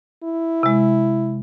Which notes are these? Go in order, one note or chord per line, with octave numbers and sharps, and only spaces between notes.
E4
C3 G#3